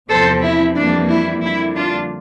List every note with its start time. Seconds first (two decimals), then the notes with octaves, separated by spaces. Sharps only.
0.09 E2 C3 F3 C4 A4 C5
0.43 E4
0.75 F2 E3 G3 A#3 D4
1.09 E4
1.42 F2 D3 G3 A#3 E4
1.76 D4 F4